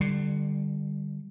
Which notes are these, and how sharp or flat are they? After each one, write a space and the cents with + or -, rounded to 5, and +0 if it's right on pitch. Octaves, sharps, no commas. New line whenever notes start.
D3 +25 G3 +0